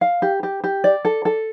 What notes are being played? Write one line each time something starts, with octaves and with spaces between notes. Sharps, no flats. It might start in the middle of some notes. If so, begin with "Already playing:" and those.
F5
G4
G4
G4
D5
A4
A4